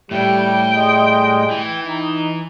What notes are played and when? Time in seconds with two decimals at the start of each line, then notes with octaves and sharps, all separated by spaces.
0.11 A2 G3 G5
0.73 G3 G#3 D#5
1.50 E3
1.86 D#4